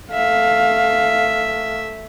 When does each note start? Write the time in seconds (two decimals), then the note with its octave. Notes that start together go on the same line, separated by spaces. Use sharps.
0.12 A3 E5 F5